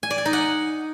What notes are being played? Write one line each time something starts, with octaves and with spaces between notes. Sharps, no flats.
G#5
D5
G#5
D#4
F#5